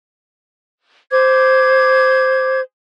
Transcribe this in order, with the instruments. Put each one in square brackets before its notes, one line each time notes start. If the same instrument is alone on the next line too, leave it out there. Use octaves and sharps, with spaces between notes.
[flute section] C5 D6 G#6